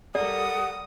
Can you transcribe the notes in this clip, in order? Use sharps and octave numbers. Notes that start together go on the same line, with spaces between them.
G3 A4 A#4 D5 F#5 D#6